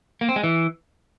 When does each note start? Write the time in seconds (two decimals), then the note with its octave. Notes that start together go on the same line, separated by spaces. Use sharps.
0.21 A#3
0.29 C4
0.36 G#3
0.44 E3